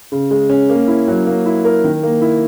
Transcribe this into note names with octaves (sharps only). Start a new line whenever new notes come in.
C#3
G#3
C#4
A#3
E4
F#3
A#3
E4
A#4
D#3
A#3
E4